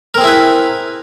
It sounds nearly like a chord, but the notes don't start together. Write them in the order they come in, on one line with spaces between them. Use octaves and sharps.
A#4 C4 G#4 E4 B4